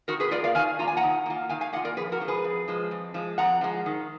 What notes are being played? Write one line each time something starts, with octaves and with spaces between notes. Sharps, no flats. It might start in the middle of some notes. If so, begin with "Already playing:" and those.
D#3 F#4 A#4
G#4 B4
A#3 F4 A#4 D5
D5 F5
D#3 F5 G#5
A#3 F4 A#5
G#5
F#5 A#5
D#3
A#3 F4
D#3 F5 G#5
F5 G#5
A#3 F4 D#5 F#5
A#4 D5
F2 G#4 B4
F#4 A#4
F3 G#3
G#4 B4
F2
F3 G#3
F2
F3 G#3
F2 F#5 A#5
F3 G#3
D#3